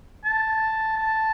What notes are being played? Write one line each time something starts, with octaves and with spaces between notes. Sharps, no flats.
A5
A5